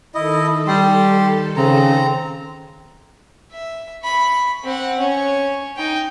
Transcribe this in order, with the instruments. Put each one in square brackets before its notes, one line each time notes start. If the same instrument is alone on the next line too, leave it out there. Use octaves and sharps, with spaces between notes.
[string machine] D#3 A4 [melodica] E4 D#5
[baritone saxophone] G3 [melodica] G4 C6
[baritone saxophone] C#3 [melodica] C4 A#5
[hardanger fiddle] E5
B5 C#6
C4 F#5
C#4 C#5
D#4 G5